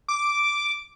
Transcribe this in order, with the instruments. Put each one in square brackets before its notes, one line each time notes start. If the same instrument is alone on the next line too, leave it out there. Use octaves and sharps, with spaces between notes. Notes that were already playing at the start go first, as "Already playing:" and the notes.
[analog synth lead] D6